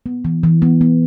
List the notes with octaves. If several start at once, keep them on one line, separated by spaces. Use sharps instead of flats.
B3
E3
E3
B3
B3